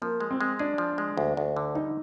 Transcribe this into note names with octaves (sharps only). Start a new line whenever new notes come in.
F3 A#3
G#3
C4
G#3
D4 G#4
F3
G#3
D2
D2
D3
G3 D#4